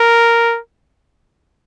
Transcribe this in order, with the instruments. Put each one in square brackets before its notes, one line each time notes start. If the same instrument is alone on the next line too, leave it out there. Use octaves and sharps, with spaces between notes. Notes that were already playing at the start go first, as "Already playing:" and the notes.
Already playing: [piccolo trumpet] A#4